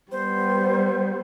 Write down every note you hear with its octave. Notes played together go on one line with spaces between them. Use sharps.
G3 B3 C5